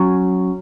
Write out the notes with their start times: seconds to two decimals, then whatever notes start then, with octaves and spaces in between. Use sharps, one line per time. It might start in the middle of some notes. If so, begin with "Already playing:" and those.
Already playing: F#3 C#4